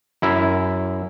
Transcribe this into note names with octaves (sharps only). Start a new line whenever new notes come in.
F#2 E4